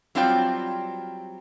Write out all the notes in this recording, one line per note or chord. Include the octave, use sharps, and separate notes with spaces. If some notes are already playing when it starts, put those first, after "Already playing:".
F#3 G3 C4 F4 D5 G5